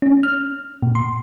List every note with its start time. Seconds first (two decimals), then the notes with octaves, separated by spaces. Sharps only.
0.02 C#4
0.23 F6
0.82 A#2
0.95 C6